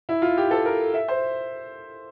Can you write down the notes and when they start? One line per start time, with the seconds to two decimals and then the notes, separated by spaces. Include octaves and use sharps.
0.09 E4
0.22 F4
0.37 G4
0.51 A4
0.65 A#4
0.94 E5
1.08 C5